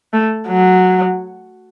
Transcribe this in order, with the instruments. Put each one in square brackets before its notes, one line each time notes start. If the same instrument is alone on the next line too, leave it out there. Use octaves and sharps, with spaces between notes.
[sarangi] A3
F#3